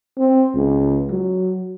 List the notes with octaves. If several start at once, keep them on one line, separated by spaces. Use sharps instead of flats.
C4
C#2
F#3